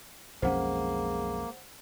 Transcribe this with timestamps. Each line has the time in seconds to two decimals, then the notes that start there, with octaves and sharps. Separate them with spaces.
0.42 B1 F2 G#3 A#3 C#4 C5 F#5